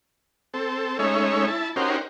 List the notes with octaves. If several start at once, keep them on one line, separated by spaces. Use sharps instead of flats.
C4 A4
G#3 A3 C#4 D#4 C#5 E5
E4 A5
C#4 D#4 F#4 G4 A#4 C5